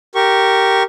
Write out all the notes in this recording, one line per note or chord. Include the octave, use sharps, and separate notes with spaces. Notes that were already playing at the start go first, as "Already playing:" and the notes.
G4 A#4 C#6